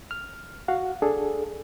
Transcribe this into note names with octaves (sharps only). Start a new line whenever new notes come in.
F6
F#4 F5 F#5
D4 G#4 A4